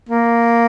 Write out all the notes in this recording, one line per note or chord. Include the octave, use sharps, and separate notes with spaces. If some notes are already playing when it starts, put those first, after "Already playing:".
A#3